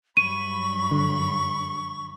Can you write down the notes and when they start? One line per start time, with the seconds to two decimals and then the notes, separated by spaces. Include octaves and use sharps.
0.17 G2 F#3 B5 C#6 D#7
0.91 D3